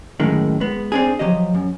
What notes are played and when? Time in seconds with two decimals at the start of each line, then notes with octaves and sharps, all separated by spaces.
0.20 F#2 A2 D#3 G#3
0.60 G#3 B3
0.92 C4 D4 G#4
1.19 F3 F#3 G4 D#5
1.55 F#2